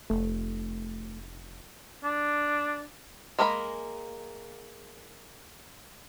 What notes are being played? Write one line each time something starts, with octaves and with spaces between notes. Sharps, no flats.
F1 A3
D4
G#3 A#3 A#4 A#5 B5